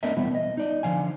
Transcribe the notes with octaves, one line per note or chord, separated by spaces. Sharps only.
A3 B3 D4 A#4 D#5 E5
B2 E3 G3 B3 C4
D#5
D#4 D5 D#5
D3 F3 F5 G#5